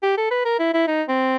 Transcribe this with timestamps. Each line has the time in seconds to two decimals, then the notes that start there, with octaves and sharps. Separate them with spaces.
0.03 G4
0.17 A4
0.31 B4
0.45 A#4
0.59 E4
0.74 E4
0.87 D#4
1.09 C4